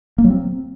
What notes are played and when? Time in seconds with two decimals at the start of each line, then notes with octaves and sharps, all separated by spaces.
0.18 A#3
0.24 F#3
0.30 C4